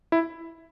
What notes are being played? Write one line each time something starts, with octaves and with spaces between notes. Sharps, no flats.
E4